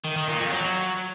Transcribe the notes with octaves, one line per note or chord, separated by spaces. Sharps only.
D#3
D#3
A#2
F2
F#3